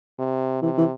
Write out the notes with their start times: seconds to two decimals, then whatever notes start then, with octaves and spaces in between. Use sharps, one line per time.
0.19 C3
0.62 C3 E3
0.78 E3